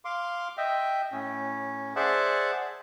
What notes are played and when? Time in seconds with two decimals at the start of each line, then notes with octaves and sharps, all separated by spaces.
0.05 F5 C6 D6
0.57 D#5 E5 G5
1.12 A2 C#4
1.96 G#4 C5 D5 E5 F#5 A5